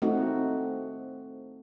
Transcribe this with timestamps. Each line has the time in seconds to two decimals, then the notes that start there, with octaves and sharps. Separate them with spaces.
0.02 A3 C4 D#4 F#4